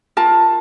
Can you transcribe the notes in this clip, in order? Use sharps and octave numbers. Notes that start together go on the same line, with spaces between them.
F4 A#4 A5